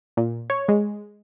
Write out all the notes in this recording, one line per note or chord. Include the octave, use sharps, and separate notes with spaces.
A#2
C#5
G#3